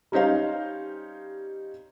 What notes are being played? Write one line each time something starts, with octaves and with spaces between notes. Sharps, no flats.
G3 C#4 D#4 C5 F5